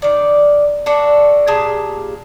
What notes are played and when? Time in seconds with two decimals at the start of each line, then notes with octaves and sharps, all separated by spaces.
0.02 D#3 D5
0.86 D4 F#4 A4
1.47 A#2 G4 G#4 A5